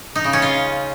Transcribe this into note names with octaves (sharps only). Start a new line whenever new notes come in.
D#4
C#3
C#4
F4